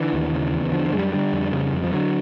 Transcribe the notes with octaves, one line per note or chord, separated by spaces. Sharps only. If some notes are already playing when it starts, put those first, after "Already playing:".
Already playing: D3 E3
D#2
C#3
E2
D3 F3
F3
F#2 G#3
G3
D3 G3
F2
C#3
F2
F3
D3 F#3